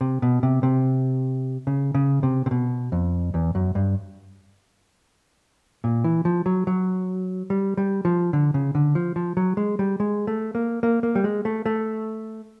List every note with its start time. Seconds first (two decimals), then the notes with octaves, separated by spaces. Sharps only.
0.01 C3
0.22 B2
0.43 C3
0.63 C3
1.67 C#3
1.94 C#3
2.23 C3
2.46 C3
2.51 B2
2.92 F2
3.34 E2
3.55 F#2
3.75 G2
5.84 A#2
6.04 E3
6.25 F3
6.46 F#3
6.67 F#3
7.50 G3
7.77 G3
8.05 F3
8.33 D3
8.54 C#3
8.75 D3
8.95 F3
9.16 F3
9.37 F#3
9.57 G#3
9.79 G3
10.00 G#3
10.27 A3
10.55 A#3
10.83 A#3
11.03 A#3
11.15 G3
11.24 G#3
11.45 A3
11.66 A3